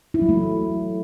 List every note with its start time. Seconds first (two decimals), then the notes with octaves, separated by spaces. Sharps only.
0.14 E4
0.22 F#3
0.29 A3